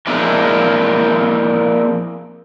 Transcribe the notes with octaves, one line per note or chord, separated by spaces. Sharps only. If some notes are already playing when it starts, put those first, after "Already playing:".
F3 G#3 A#3 C4 D4 E4